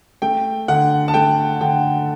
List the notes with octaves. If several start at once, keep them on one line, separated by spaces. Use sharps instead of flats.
A3 G5
D3 F#5
A5
A3 G5
D3 G5